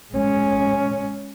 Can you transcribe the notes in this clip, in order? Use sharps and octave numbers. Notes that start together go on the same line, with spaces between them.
G#3 C#4